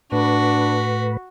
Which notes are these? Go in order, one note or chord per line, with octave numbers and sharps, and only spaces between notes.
A2 D4 F#4 B4